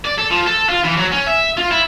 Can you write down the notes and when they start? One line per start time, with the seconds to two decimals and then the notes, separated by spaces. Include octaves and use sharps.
0.06 D5
0.18 A4
0.31 F3
0.46 A4
0.69 F4
0.84 E3
0.97 F#3
1.11 C#4
1.26 E5
1.57 F4
1.71 E4